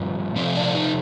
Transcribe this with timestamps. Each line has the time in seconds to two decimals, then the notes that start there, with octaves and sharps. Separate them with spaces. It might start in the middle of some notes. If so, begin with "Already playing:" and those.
Already playing: G2 F3 A3
0.36 C3 F3 A3 C4
0.55 D4
0.75 D#4